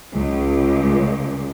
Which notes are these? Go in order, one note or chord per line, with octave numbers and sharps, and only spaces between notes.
C#2